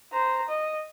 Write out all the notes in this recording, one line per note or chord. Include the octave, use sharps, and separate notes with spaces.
C5 A#5
D#5